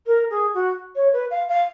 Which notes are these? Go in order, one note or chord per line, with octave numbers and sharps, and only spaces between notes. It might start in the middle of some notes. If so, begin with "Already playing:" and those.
A#4
G#4
F#4
C#5
B4
F5
F5